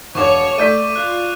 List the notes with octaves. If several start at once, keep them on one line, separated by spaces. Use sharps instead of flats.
E1 C#5 C#6 D6
A3 D5 G6 B6 D#7
F4 F#6